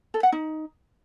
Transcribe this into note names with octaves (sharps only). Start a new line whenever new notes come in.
A4
F#5
D#4